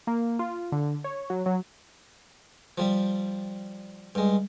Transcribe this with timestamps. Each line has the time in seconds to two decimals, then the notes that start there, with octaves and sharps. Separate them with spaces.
0.07 A#3
0.39 F4
0.72 D3
1.04 C#5
1.30 F#3
1.46 F#3
2.78 F3 G3
4.15 G2 G#3